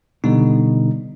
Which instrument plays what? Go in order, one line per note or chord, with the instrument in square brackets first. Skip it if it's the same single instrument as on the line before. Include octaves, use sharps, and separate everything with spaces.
[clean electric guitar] B2 [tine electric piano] D3 G3 D#4